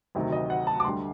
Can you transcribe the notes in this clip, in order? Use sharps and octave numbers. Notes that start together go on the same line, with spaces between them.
D2 C3 D#3 F#3
D#5
F#5
A5
D6
D2 D3 G3 C6